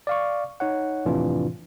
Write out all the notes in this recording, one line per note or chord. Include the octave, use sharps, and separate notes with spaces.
D5 F5 C#6
D#4 C#5 F#5
F2 A2 C3 E3 D4 F4